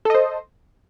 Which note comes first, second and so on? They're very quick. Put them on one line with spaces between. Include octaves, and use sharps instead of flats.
A4 D#5 C5